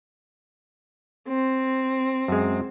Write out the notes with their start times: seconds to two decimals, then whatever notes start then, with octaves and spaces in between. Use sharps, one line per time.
1.28 C4
2.28 F#2 G#3